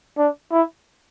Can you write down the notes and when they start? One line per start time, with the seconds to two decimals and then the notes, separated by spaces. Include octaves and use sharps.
0.18 D4
0.52 E4